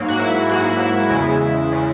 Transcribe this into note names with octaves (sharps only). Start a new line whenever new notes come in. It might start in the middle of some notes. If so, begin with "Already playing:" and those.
Already playing: G#2 F#3 A#3
F#4
E4
G#2 F#3 A#3 F#4
E4
E2 C#3 G#3
C#3 G#3